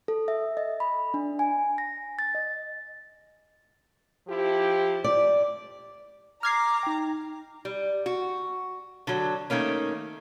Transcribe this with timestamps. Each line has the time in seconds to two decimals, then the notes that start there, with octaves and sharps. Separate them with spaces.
0.08 A4
0.28 E5
0.57 D#5
0.80 B5
1.14 D4
1.39 G#5
1.78 A#6
2.19 A6
2.35 D#5
4.28 F3 E4 G4
5.04 D5
6.43 A#5 D6 F6 G#6 C7
6.83 D#4 G5
7.65 G3
8.06 F#4
9.07 D3 F#3
9.50 D#3 A3 A#3 C#4